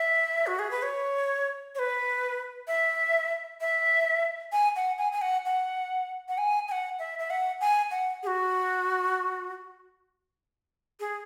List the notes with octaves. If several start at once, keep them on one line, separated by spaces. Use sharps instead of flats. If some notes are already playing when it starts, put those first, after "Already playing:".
Already playing: E5
F#4
G#4
B4
C#5
C#5
B4
E5
E5
G#5
F#5
G#5
G#5
F#5
F#5
F#5
G#5
G#5
F#5
E5
E5
F#5
G#5
F#5
G#4
F#4
G#4